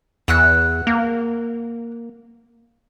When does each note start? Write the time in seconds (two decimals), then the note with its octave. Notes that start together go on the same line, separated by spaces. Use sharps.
0.28 E2 F#5 E6 F#6
0.87 A#3